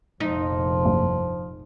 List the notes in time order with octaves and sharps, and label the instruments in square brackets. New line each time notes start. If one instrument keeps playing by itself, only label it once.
[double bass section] F1 A#1 F2 [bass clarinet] F3 [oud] D#4
[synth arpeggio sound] G2 A#2